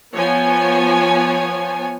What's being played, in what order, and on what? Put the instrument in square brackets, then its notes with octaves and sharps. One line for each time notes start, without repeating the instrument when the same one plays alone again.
[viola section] F3 B3 C#5 G#5